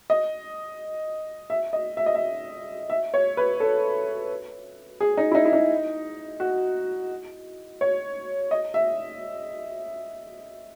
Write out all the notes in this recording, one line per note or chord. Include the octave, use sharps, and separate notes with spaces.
D#5
E5
D#5
E5
D#5
E5
E5
C#5
B4
A4
G#4
D#4
E4
D#4
E4
D#4
F#4
C#5
D#5
E5